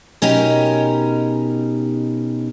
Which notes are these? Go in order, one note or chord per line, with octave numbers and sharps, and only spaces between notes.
B2 C#4 D#4 G4 A#4